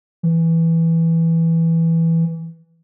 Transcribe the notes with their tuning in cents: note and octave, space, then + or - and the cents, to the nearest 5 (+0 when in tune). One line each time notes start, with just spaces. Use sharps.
E3 +0